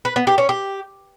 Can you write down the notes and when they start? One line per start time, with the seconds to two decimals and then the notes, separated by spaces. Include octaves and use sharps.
0.05 B4
0.16 B3
0.27 G4
0.38 C#4
0.49 G4